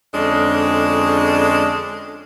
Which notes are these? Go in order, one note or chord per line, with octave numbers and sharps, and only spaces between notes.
F2 D3 G#3 C#4 D4